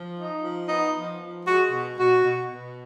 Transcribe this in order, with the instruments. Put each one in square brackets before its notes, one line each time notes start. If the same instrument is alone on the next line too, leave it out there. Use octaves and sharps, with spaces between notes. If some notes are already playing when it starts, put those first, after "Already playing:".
Already playing: [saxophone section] F3
D#4
F3
B3 D#4
F3
F3
G#3 F#4
B2
B2 F#4
B2
B2